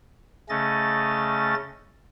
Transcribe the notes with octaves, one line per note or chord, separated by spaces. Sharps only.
C#3 A3 C#4 D#5 A6